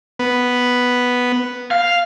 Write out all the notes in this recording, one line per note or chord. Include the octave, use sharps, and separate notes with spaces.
B3
F5